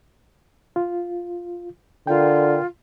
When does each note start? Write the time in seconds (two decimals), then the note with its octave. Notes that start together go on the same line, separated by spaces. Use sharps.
0.76 F4
2.07 D3 F4 A#4 G5